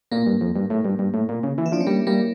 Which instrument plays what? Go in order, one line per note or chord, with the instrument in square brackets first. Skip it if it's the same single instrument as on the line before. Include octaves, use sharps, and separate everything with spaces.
[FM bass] A#2 [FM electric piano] A#3
[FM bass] G2
F2
G2
A2
G2
G2
A2
A#2
C#3
E3
[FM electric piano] E4
[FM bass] F3 [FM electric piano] D4
[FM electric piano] C#4
[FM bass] G3 [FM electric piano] A#3
[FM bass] G3 [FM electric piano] A#3